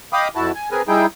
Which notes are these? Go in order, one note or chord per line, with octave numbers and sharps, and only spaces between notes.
D#5 F5 G5 B5 D6 D#6
F2 E4 F#4 A5
G#5
C4 G#4 A#4 B4 G#5
G3 D#4 E4 G#4 G5